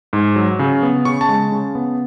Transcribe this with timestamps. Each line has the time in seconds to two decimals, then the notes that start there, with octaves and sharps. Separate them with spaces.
0.13 G#2
0.36 F#3
0.59 C#3
0.82 B3
1.05 C#3 C#6
1.21 A5
1.29 G#3
1.52 C#3
1.75 B3